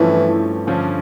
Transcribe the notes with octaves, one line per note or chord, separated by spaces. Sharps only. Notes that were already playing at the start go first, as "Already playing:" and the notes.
Already playing: G2 E3 F3 A3 C#4
G2 D3 F3 C#4